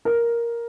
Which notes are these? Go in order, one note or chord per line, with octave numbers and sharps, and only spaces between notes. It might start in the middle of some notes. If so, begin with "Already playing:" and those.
A#4